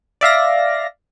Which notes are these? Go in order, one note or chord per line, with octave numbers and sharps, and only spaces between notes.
D5 E5 F5 A#6